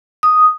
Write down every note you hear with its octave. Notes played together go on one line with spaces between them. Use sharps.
D#6